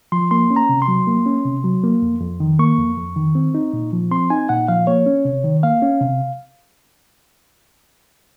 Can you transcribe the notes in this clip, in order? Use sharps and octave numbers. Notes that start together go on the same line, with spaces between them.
F3 C6
A#3 C6
C#4
A#5
C3
C6
F#3
A#3
C#4
C3
F#3
A#3
F2
F2
D#3
A#3 C#6
F2
F2
D#3
C4
D#4
A#2
F3
C4 C6
D#4 G#5
A#2 F#5
F3 F5
A#3 C#5
C#4
C3
D#3
A#3 F5
C#4
C3